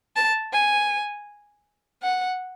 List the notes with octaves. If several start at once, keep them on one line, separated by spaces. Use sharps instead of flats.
A5
G#5
F#5